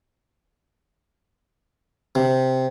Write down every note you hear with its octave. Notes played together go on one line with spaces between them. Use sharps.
C3